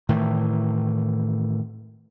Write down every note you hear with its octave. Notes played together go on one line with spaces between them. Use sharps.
A2 D#3 E3